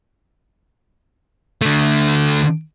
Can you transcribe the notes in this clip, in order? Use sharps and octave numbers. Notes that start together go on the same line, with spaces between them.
D3 A3